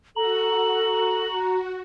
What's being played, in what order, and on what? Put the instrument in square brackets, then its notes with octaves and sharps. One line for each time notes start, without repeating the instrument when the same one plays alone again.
[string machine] F#4 [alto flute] A4 [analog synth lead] A#5 [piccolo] F#7